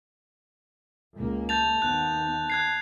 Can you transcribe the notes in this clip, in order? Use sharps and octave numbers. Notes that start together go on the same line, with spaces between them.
C#2 A#3
A5 G6 A6 F7
D#2 B3 F#6
F#6 G#6 C7